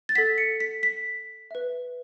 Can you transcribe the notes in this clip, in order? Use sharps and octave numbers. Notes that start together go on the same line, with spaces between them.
A6
A4 F#5 B6
C#7
B6
B6
B4 E5